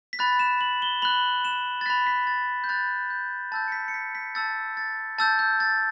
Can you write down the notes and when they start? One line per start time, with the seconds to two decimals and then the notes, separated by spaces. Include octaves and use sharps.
0.13 B6
0.19 B5 F#6 A6
0.39 E7
0.61 F#7
0.82 G7
1.02 B5 F#6 F#7
1.45 E7
1.81 A6
1.86 B5 F#6 B6
2.07 B6
2.27 A6
2.64 G6
2.69 B5 F#6 A6
3.10 G6
3.52 A5 E6 G6 A6
3.68 C#7
3.72 B6
3.88 C#7
3.94 B6
4.15 B6
4.35 A5 E6 G6 A6
4.77 A6
5.18 A5 E6 G6 A6
5.39 G6
5.60 A6